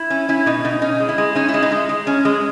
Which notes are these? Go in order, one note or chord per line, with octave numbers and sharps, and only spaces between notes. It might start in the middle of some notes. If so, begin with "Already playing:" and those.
Already playing: E4
C#4
C#4 E4
B2 D#4
B2 D#4
C#4 D#4
G#3
E4
G#3
C#4 D#4
E4
G#3
D#4
G#3
G#3
C#4
G#3